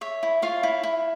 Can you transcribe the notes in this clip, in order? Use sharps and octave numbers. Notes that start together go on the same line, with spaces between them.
C#5 E5
E4
F4 C#5 F5
E4
E4